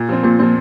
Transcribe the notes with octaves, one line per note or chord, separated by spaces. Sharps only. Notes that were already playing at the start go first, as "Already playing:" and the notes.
Already playing: A#2
F3 C4
A#2 A#3
F3 A#3 C4